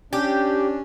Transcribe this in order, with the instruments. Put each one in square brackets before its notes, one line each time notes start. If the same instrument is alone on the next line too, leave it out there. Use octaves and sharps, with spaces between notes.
[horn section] C#4 D4 [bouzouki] G4